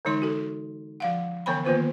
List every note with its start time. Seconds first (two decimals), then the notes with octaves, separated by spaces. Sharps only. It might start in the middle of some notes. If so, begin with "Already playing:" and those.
0.05 D3 E3 G#3 D#4 C#5 C6
0.21 D#4 F#4 A4
1.00 F3 F5 F#5
1.46 D3 E3 B3 C#5 G5 B5
1.65 D#3 A#3 B3 F4 B4 C5